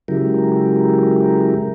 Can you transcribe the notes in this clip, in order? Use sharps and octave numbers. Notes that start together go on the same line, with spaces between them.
C#3 F#3 G#3 E4 G4 A#4